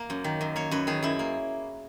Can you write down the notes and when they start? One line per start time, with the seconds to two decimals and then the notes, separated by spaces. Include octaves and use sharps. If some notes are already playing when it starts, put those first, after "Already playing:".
Already playing: A#3
0.10 F#2
0.24 D#3
0.41 F#2
0.56 A#3 C#5
0.71 F#2 B4
0.87 D#3 G#4
1.02 F#2 E4
1.19 A#3